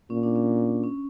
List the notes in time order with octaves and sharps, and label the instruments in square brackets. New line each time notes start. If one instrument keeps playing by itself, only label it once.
[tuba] A#2 [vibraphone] C#4
[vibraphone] D4
C#4
C#4